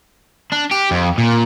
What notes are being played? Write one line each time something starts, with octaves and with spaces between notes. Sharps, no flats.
D4
G4
F2
A#2